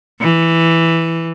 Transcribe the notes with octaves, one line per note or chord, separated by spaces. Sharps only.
E3